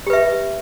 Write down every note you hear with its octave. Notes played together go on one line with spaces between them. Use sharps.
G4 B4 E5